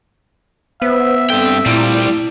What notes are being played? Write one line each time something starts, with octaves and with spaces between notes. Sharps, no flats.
B3 B4 C5 E5 F#5
G2 C4 A4 G5
A#2 G3 A3 C4 E4